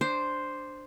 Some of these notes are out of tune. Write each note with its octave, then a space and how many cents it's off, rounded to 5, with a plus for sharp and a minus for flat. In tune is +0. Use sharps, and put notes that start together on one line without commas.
D4 +5 C5 +0